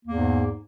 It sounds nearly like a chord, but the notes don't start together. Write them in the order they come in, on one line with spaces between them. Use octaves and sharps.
A#3 E2 G#2